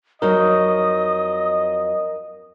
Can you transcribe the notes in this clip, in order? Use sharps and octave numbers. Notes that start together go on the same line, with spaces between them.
F2 F#3 D#4 A#4 D#5 D#6